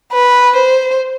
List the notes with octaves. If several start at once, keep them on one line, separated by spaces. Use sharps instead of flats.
B4
C5